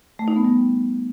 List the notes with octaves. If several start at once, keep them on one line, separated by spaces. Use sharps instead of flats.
A3
D#4
B3
G3